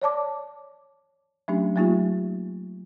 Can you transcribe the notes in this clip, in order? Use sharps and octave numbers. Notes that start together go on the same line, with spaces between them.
C#5 D5 A5 D6
F#3 A3 C#4 D4 G4
F#3 A3 A#3 D#4 F4 G4